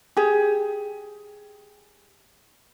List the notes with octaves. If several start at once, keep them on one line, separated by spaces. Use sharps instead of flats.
G4 G#4